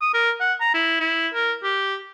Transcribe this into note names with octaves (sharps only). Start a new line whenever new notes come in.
D#6
A#4
F#5
A#5
E4
E4
A#4
G4